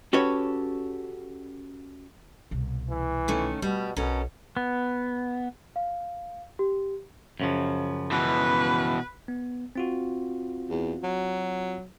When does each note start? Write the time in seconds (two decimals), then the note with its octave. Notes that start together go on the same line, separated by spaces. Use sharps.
0.13 C#4 F#4 G4 A4 B4 C#5
2.51 C2 B2
2.90 E3
3.28 D#3 A3 C#4
3.62 B2 G3 A3
3.96 B1 B2 C#4 A4 A#4
4.57 B3
5.76 F5
6.59 G4
7.40 F#2 C#3 F3
8.11 B2 E3 B4
9.28 B3
9.76 C4 F4 F#4
10.70 E2
11.03 F#3